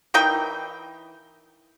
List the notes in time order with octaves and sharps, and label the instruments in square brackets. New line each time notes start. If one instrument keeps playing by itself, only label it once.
[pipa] E3 D#4 A#4 G5